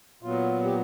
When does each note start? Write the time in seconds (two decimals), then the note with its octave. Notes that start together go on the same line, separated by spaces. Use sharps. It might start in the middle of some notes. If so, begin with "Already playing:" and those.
0.23 A#2 F#3 B3 F4
0.64 G4